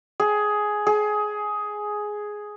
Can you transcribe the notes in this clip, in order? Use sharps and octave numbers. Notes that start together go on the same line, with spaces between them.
G#4
G#4